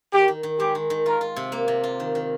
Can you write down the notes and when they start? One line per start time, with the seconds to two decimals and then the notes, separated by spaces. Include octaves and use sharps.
0.13 D#3 G4
0.28 D#3
0.43 D#3
0.59 G#3 G4
0.75 D#3
0.90 D#3
1.06 F4 A#4
1.21 F4
1.36 C3
1.52 A#3
1.68 C3
1.84 F4
2.00 D#3
2.15 D#3